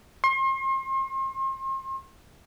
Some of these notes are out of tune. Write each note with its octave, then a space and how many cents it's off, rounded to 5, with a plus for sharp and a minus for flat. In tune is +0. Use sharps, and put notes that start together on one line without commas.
C6 +35